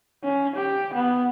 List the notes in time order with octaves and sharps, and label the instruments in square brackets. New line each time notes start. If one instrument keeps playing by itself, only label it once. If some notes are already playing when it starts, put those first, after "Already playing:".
[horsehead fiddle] C#4
G4
B3